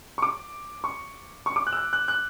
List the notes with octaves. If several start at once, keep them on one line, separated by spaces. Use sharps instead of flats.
C#6
D6
C#6
C#6
D6
F#6
E6
F#6
F#6
F#6